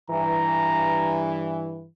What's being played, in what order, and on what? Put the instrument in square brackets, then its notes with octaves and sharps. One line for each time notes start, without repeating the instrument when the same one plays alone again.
[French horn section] G2 E3 [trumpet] A#5